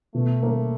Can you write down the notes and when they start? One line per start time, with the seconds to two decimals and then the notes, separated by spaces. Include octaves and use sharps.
0.14 B2 A3
0.43 A#3